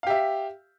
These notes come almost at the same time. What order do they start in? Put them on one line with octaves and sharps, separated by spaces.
F5 G4 E5